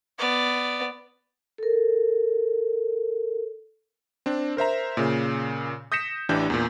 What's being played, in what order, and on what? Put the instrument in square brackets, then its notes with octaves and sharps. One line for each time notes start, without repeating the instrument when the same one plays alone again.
[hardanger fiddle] B3 D5
[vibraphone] A4 A#4
[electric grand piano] C4 D4
A#4 C5 E5 A#5
A#2 C#3
D#6 G6 A#6 B6 C#7 E7
A1 E3 D4 G4 G6
E2 A#2